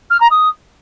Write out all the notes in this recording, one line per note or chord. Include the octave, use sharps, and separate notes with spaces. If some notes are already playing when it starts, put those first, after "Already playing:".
F6
A#5
D#6